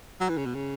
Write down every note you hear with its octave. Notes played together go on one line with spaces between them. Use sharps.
F#3
E3
C#3
B2
C#3